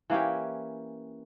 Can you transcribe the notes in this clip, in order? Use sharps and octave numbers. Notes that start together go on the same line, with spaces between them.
E3 A#3 C#4 G4